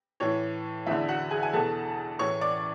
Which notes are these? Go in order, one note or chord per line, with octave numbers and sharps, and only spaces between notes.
A2 E3 C#5
E2 D3 E4 E5
F#4 F#5
G#4 G#5
G#5
E2 B2 A4 A5
A2 E3 C#5 C#6
D5 D6